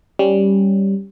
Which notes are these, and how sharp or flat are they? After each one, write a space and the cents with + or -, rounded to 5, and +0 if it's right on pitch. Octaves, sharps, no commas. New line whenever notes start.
G3 +0 C#4 +0